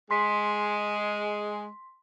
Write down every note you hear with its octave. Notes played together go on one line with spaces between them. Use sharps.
G#3 C6 B6